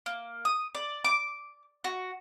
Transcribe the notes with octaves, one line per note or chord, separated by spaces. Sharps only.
A#3
D#6
D5
D6
F#4